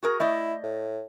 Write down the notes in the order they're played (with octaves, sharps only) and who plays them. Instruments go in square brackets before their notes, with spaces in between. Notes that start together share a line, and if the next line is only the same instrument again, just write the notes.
[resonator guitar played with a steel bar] F#4 G#4 A#4
[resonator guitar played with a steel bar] A3 D5 D#5 [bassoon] E4
[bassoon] A2